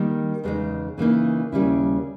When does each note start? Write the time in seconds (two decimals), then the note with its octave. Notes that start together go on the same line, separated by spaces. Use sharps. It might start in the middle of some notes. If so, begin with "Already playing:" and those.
Already playing: D#3 G3 A#3 D#4
0.44 E2 C#3 G#3 D#4
0.98 C#3 E3 A#3 D#4
1.52 D#2 C#3 G3 C#4 E4